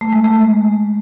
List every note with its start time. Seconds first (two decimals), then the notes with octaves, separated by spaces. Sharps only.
0.01 A3
0.13 G#3
0.24 A3